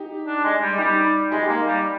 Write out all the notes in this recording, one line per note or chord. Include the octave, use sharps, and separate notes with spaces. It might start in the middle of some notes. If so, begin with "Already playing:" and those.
Already playing: D#4 G4
D4
G#3
G3
G3 D#4 G4
G#3 D#4 G4
A#3
G3